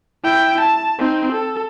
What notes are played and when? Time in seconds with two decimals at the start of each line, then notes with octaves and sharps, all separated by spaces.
0.24 E4 G5
0.61 A5
0.99 C4 D#4
1.33 A4